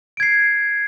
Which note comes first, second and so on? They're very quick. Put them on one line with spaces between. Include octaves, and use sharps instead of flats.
D7 G#6 C7